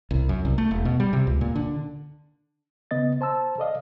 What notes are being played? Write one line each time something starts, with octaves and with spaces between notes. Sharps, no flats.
C2
F#2
C2
A3
E1
B2
G3
C3
C#2
A#2
D3
C#3 B3 D#5 A6
C5 A5 A#5 E6
A4 D5 D#5 F5